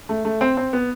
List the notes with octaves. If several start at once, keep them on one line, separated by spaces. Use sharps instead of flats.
A3
A3
C4
C4
B3